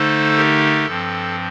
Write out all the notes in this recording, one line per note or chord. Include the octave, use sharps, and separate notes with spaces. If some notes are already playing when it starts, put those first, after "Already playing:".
Already playing: D3 A3 D#4 A4 C5
G4 A#4
G2 F3 C4 A4